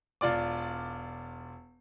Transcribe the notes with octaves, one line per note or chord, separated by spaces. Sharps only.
E1 F4 D5 D6